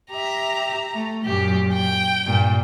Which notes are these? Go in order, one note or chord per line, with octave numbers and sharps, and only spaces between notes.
G4 E5 A#5
A3
F#2 A#2 G4
G5
G2 A#2